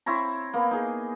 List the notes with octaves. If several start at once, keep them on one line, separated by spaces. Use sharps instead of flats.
C4 E4 C#5 A#5
A#3 B3
D#4 G#4